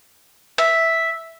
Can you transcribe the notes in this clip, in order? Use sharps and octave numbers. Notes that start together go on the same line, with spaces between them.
E5